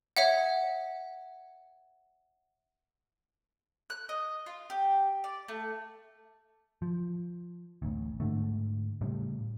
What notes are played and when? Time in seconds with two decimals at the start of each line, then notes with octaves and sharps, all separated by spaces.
0.17 C#5 E5 F#5
3.90 F#6
4.09 D#5
4.46 F4
4.70 G4
5.24 D5
5.48 A3
6.82 F3
7.82 A1 D2
8.20 G#2 D3 A3
9.01 A2 C#3 G3